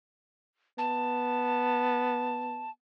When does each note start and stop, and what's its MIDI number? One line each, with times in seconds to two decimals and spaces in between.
0.78 2.69 59
0.78 2.70 81